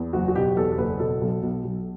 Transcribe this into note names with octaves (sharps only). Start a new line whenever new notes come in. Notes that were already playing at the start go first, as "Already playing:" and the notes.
Already playing: E2
F#1 F#4
F#4
B2 G4
E2 A4
A4
F#1 B4
B2 A4
B1
B1
B1